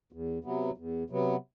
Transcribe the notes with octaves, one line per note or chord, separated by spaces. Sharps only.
E2
C3 F#3 B3
E2
C3 F#3 B3